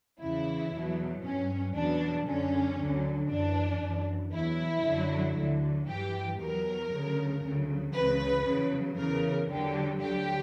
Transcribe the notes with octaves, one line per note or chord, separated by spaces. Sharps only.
E2 C#3 E3 E4
E2 B2 F#3
G2 F#3 C#4
E2 B2 F#3 D4
F#2 D3 F#3 C#4
D2 D3 F#3
F#2 E3 D4
F#2 E3
E2 B2 F#3 E4
F#2 D3 F#3
D2 D3 F#3
G2 E3 G4
E2 B2 F#3 A#4
D2 C#3 F#3
D2 C#3 F#3
C#2 C#3 E3 B4
E2 C#3 F#3
E2 C#3 E3 A#4
E2 D3 F#3 G4
D2 D3 F#3 G4